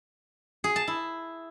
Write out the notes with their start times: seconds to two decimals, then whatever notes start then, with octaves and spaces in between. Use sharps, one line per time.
0.64 G#4
0.76 A5
0.87 E4